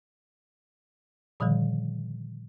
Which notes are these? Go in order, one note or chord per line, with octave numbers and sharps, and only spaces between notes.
A#2 D3 D#3 F3 G3